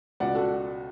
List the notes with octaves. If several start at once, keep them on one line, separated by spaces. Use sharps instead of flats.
C#2 B2 D5 F#5
F#4 A4